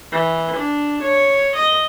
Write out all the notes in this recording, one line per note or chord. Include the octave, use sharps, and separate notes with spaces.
E3
D4
C#5
D#5